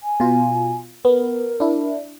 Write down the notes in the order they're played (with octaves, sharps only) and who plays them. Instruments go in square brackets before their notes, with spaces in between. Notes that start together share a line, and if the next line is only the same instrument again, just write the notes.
[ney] G#5
[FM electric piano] B2 F4
[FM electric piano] B3 [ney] A#4
[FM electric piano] D4 E4